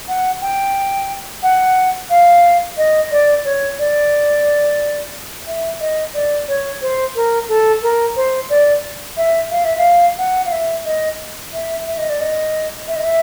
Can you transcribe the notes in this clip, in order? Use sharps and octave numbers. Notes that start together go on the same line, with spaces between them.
F#5
G5
F#5
F5
D#5
D5
C#5
D5
E5
D#5
D5
C#5
C5
A#4
A4
A#4
C5
D5
E5
F5
E5
F5
F#5
F5
E5
D#5
E5
E5
D#5
D5
D#5
E5
D#5
E5